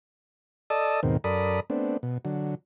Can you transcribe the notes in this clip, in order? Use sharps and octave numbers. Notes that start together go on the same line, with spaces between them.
A4 D5 D#5 A5 D#6 E6
D#2 G#2 B2 D#3 A#3 C4
F#2 A4 A#4 D5 B5 D#6
A3 B3 C4 D4
B2
D3 F#3